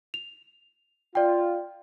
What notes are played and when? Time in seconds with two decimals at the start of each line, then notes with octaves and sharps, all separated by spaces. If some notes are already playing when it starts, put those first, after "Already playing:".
0.14 F7
1.15 F4 D5 G5